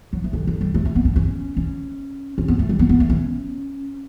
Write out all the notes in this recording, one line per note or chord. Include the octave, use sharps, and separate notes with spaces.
F#3
E3
D3
D3
G3
A3
A3
B3
C#4
C#4
C#4
C#4
B3
A3
G3
B3
B3
A3
C#4